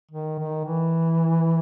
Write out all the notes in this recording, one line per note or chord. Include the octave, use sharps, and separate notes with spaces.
D#3
D#3
E3